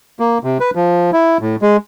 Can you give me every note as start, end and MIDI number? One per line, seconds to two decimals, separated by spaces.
0.20 0.38 58
0.44 0.58 48
0.60 0.71 71
0.75 1.11 53
1.13 1.38 64
1.41 1.56 45
1.62 1.77 56